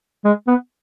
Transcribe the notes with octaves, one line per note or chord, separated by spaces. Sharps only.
G#3
B3